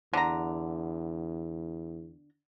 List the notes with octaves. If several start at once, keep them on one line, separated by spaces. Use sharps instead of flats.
E2 D3 A#5